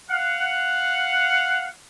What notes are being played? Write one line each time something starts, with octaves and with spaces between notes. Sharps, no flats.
F5 F#5